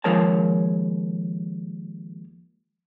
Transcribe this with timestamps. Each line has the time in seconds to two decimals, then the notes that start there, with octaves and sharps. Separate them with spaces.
0.04 D#2 F3 G#3 A#4 C#5 A5